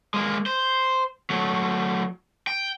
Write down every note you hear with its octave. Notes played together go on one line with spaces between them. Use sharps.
G#3 A#3
C5
F#3 A3
G5